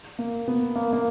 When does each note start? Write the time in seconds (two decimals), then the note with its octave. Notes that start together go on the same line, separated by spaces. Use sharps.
0.19 A#3
0.48 B3
0.76 A#3
0.93 A#3